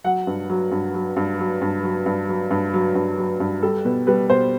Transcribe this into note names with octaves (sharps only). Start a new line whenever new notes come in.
F#3 F#5
G2
F#3
G2
F#3
G2
F#3
G2
F#3
G2
F#3
G2
F#3
G2
F#3
G2
G3 A4
B2 B4
G3 B4
B2 C5